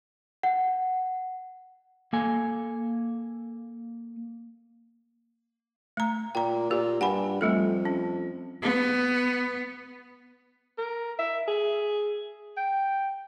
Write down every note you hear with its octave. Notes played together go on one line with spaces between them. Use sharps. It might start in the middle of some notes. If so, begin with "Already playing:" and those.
F#5
A#3 A4 G#5
A3 A#5
A#2 G5 A#5
A#2 A#3 G4
G2 F#5 G#5 B5
F2 G3 A3 A4
C#4
B3
A#4
E5
G#4
G5